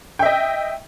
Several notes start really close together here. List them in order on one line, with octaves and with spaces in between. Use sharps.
G5 E5 D#5